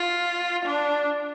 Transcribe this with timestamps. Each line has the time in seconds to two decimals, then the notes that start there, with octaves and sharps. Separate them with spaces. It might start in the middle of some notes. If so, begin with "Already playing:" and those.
Already playing: F4
0.65 D4